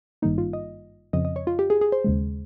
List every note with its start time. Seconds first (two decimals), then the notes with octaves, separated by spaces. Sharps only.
0.22 G#1 G2 D#3 G3 A#3 D#4
0.38 F4
0.53 D#5
1.13 F2 C#3 F3 C4 D#5
1.25 D#5
1.36 C#5
1.47 F4
1.59 G4
1.70 G#4
1.81 G#4
1.92 C5
2.04 D#2 C#3 G#3